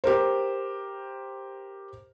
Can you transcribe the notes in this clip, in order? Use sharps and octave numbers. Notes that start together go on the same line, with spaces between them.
G4 A#4 C5